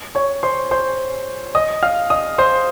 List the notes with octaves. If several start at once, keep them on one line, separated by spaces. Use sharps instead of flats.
C#5 C#6
C5 C6
C5 C6
D#5 D#6
F5 F6
D#5 D#6
C5 C6